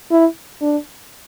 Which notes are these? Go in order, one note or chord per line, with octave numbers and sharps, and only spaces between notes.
E4
D4